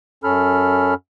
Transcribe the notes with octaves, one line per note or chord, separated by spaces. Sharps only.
F#2 C#4 A4 B5 F6